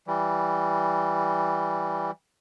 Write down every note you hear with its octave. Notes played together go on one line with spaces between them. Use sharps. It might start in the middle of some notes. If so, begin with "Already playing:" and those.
E3 G3